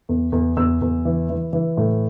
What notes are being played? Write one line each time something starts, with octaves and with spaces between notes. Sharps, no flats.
E2
E2
E2 E6
E2
E3
E3
E3
A2